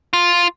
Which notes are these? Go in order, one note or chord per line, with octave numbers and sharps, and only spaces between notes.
F4